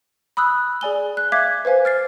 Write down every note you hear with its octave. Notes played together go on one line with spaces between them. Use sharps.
B5 D#6 E6 F#6
G#4 D5 G#5 G7
F#6
E5 F5 D6 G#6 B6
B4 C5 F5 G#5
F6 A6 C7